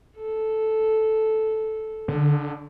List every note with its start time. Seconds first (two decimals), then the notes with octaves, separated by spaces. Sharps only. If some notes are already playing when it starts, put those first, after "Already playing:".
0.17 A4
2.08 D3